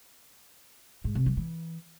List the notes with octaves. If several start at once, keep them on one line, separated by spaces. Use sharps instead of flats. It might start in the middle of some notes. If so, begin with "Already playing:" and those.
G#2
C3
F#3
E3